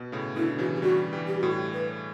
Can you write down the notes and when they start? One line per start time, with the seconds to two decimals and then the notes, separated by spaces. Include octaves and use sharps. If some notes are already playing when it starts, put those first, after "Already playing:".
Already playing: B2
0.12 A2 C#3
0.36 B2 D3 E4
0.58 C#3 E3 F#4
0.76 G4
0.82 E3 G3 F#4
1.13 E3 G3
1.27 G4
1.39 A2 F#4
1.52 G4
1.73 B4